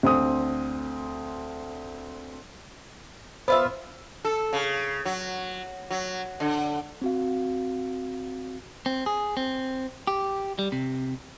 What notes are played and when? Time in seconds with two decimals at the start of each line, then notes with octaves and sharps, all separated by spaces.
0.03 D2 C4 D#6
3.48 B3 F4 C5 E5
4.25 A4
4.53 C#3
5.05 F#3
5.90 F#3
6.40 D3
7.02 C4 F#4 F5
8.86 C4
9.06 G#4
9.37 C4
10.07 G4
10.59 G3
10.72 C3